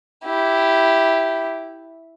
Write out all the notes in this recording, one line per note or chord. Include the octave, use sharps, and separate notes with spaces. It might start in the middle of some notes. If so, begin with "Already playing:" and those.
E4 G4